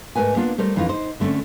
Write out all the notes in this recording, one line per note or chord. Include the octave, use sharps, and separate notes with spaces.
G#2 A3 G#4 A#4 B4 G#5
A#3 B3 D4 F4
G3 A3 A#4 C5
F2 E3 C#4 D#4 F4
D#4 C5
D3 A3 A#3 C4 C#4